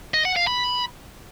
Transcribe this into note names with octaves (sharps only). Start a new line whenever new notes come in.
D#5
F#5
F5
B5